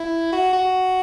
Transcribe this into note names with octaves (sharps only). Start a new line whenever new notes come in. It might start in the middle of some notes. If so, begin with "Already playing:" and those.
Already playing: E4
F#4
F#4